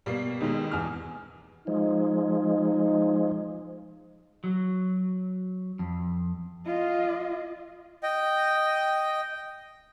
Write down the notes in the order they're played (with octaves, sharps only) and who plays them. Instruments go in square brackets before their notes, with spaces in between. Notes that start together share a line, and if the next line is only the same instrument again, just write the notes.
[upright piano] B2 [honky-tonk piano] G3 A#3 C7
[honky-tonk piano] D#2 B2 [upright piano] G#3 D#4
[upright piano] E2 F6
[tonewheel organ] F3 G#3 [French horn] D#4
[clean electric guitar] F#3
F2
[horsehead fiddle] F4 D#5
[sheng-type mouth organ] D#5 G5